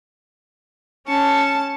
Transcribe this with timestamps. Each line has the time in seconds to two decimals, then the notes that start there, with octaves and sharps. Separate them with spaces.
1.08 C#4 A5 C#6